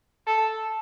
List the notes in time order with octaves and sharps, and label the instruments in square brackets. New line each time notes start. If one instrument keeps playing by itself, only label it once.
[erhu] A4